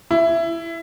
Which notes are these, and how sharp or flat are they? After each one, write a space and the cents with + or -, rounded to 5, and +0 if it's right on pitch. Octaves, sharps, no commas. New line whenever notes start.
E4 +15